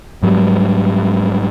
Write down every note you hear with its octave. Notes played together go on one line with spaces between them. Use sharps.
G#2 F#3 G3